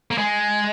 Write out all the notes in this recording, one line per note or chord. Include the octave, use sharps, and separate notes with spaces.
A#3
G#3